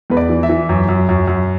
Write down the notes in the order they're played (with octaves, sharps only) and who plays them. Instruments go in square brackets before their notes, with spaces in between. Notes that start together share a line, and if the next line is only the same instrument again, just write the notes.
[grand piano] E2 B4
D5
E3
E5
E3
F#2
F#2
F#2
F#2